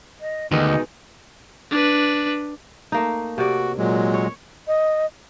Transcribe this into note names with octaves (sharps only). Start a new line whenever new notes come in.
D#5
D2 B2 D#3 G#3 D#4
D4 B4
A3 A#3 D#4
C3 F#4 D5
A#2 F#3 G#3
C#5
D#5